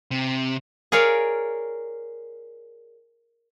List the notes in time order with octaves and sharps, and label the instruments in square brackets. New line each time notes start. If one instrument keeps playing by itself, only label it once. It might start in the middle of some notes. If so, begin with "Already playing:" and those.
[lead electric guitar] C3
[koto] G#4 A#4 C#5 D5 F5